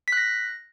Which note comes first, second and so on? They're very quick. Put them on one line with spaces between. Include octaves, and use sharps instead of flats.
B6 F#6 A#6